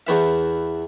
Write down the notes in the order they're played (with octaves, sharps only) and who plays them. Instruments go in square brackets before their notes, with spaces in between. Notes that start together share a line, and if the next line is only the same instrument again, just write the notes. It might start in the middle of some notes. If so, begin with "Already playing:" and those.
[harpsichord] E2 E3 E5